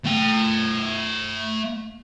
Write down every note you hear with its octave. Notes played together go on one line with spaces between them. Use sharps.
A3 G5